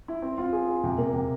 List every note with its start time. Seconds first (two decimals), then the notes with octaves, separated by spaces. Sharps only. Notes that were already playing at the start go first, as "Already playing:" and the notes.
0.08 E4
0.22 C4
0.38 F4
0.52 G#4
0.68 G#4
0.84 C3
0.98 A#3
1.13 C3